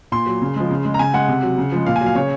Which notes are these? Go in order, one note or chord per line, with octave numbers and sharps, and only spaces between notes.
A#2 C6
F#3
C#3
F3 G#3
C#3
G#3
A#5
C#3 G#5
G#3 F#5
C3
F#3
C#3
F3 G#3
A#2 F5
G#5
F#3
F5
C#3 C#5